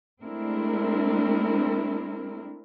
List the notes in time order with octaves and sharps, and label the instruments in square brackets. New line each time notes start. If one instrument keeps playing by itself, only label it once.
[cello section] G#3 A3 C4 D4 E4 A#4